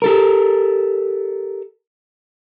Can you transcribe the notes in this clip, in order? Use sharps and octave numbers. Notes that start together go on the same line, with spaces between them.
G4 A4 A#4